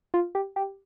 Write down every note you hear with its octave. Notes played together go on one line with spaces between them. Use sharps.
F4
G4
G4